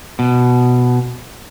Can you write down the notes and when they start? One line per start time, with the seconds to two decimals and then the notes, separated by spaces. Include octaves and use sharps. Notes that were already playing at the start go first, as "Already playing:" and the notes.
0.19 B2